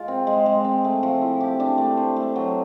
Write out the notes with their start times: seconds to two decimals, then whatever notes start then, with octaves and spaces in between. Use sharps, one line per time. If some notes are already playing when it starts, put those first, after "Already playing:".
Already playing: G#3 F4
0.08 C4
0.27 G#3
0.46 G#3
0.65 C4
0.84 A3
1.03 F3
1.22 E4
1.41 G4
1.60 D4
1.78 A3
1.97 C5
2.16 A3
2.36 F#3